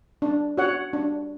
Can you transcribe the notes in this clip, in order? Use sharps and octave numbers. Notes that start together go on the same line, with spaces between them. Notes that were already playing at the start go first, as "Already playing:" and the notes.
D4
F#4 C#5 F#5
D4